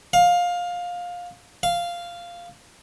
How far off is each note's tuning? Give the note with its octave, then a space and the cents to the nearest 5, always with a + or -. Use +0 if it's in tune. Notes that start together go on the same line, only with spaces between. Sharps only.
F5 +20
F5 -5